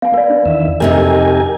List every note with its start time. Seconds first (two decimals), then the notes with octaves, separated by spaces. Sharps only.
0.02 B3 F5 G#5
0.14 B3 B4 D5
0.30 D4
0.46 E2 D#3 E5
0.80 F2 C3 D#4 G4 A#4 G#5